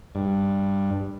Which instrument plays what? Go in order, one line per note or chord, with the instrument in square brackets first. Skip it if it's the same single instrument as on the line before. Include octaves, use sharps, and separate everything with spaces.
[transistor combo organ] G2